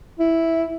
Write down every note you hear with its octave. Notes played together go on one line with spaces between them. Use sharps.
E4